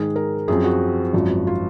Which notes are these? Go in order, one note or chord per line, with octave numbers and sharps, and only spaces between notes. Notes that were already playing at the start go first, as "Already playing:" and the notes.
Already playing: G#2 D#3 G#3 G#4
A#4
F#2 F3 C4 G#4
F#4
G#1 F#2 F3
F4